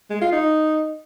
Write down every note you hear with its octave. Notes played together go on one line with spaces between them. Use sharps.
G#3
F4
D#4